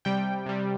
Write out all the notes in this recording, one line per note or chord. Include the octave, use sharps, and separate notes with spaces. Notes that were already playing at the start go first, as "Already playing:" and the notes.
C3 G3 G5
C3 G3